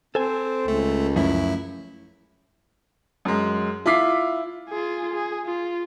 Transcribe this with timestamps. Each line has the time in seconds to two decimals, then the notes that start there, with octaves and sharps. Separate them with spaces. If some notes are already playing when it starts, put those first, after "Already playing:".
0.15 C4 A4 C5 G#5
0.68 C#2 A3
1.16 F#2 F3 A3 C#4 E4
3.25 F#2 G#3
3.86 E4 F4 D6 B6 C7
4.69 F4 G#4
5.13 G#4
5.46 F4